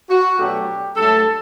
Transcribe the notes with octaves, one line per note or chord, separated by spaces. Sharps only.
F#4
B2 F#3 A3 D4 G4
G2 F#3 A3 A4